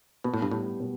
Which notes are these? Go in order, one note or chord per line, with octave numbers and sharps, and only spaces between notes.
B2 B3
A2
G2
A2 G3
B2